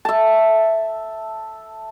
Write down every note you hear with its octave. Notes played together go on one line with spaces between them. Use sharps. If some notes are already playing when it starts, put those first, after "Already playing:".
E5 A5